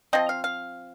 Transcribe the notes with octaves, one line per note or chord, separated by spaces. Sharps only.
F3 C4 D#5
F5
F5